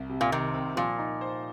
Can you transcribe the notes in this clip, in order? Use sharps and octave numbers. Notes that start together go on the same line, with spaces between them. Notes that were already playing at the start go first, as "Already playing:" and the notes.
Already playing: C2
C3
A#2
C3 D#3
C4
A#2 F3
D#4
C5